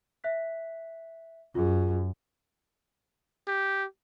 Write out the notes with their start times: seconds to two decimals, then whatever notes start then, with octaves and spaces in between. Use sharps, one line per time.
0.24 E5 F#6 B6
1.55 F#2 F4 G#4
3.48 G4